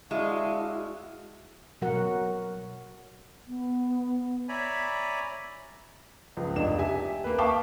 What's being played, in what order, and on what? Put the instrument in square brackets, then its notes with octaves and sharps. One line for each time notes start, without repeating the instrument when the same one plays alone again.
[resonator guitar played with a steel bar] G#3 [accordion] D4 F5 C#6 [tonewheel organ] E4 F#4 [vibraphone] E5
[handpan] B2 F#3 F#4 A#4 F#5
[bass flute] B3
[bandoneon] C#5 D5 E5 G#5 A#5 B5
[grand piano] C#2 F3
F1 D4 D#4 E7
G4 E5 G#5
A#3 B4
E5 F5 G5 A5 C#6 D6